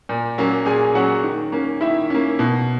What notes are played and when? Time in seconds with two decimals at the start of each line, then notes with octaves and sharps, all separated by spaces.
0.09 A#2
0.38 F#3 A#3 C#4
0.66 A#2 G#4 G#5
0.95 F#3 A#3 C#4 F#4 F#5
1.23 D#3
1.52 A#3 C#4
1.81 D#3 E4 E5
2.10 A#3 C#4
2.39 B2